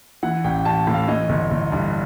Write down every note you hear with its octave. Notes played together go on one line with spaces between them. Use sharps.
E3 F#5
A1 G5
A1 A5
A2
F5
E3 D#5
G1
G1
G2